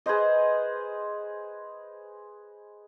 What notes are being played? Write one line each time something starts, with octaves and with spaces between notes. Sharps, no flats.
G#4 B4 C5 D#5